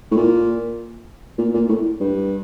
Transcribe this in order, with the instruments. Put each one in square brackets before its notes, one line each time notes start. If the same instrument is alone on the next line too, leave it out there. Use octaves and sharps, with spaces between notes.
[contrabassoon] A2
A#2
A#2
A#2
A2
G2